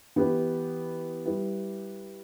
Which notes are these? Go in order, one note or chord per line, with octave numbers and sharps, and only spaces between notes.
E3 B3 G4 B4
G3 E4 G4 B4